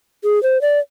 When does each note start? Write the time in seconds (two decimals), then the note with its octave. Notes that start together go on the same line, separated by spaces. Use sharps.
0.24 G#4
0.43 C5
0.62 D5